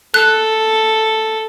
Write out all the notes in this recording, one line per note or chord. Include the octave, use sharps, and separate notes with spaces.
A4 F#6